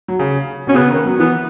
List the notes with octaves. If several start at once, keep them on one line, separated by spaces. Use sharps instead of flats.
F#3
C#3
B2 C#4
C#3 B3
D#3
F#3
E3 B3